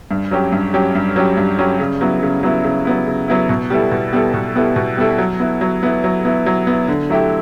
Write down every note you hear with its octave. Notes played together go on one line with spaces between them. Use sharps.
G2
F#3 C#4 G4
G2
F#3 C#4 G4
G2
F#3 C#4 G4
G2
F#3 C#4 G4
C#3
F#3 B3 E4
C#3
F#3 B3 E4
C#3
F#3 B3 E4
C#3
F#3 B3 E4
B2
G3 B3 E4 A4
B2
G3 B3 E4 A4
B2
G3 B3 E4 A4
B2
G3 B3 E4 A4
F#3
B3 E4
F#3
B3 E4
F#3
B3 E4
F#3
B3 E4
D3
F#3 A3 E4 G4